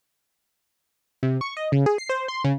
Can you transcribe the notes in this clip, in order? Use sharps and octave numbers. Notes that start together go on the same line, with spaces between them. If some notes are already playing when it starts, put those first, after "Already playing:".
C3
C#6
D#5
C#3
G#4
C7
C5
C6
C#3